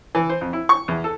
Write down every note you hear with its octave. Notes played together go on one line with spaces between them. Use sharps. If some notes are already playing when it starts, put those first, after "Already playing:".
E3
C5
F2
E4
C#6
E2
A4